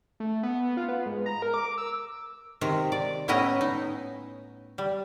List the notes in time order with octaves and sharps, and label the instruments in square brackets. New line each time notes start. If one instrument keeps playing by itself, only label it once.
[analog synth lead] A3
B3
F4
B3
G#2
A#5
A#4
D6
E6
[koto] C3 D#3 A#5
D5
A2 B3 C#4 E4 D#5 A#5
D#4
G3